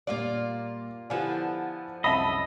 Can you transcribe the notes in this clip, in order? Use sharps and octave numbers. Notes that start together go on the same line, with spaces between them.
A#2 G3 A#3 F4 D5
D3 F3 B3 E4 G4 G#5
C2 F#2 D#5 E5 A5 B5